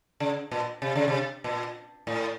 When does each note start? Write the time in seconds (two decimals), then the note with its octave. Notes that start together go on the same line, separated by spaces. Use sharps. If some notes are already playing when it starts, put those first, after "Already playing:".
0.20 C#3
0.51 A#2
0.82 C3
0.95 C#3
1.08 C3
1.44 A#2
2.07 A2